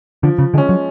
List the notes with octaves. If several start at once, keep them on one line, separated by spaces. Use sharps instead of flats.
D3 F3
C#3
D3 G#3 C#4
F#3